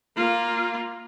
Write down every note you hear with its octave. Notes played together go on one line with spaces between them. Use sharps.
A#3 F4